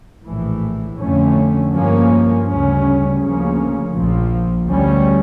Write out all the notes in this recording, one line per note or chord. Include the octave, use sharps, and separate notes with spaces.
A#1 A2 E3
F2 D3 A3 C#4
G2 F3 A#3 C#4
D2 C#3 G3 C#4
D2 C#3 F3 A#3 C#4
A#1 A#2 F3
D2 D3 G3 C#4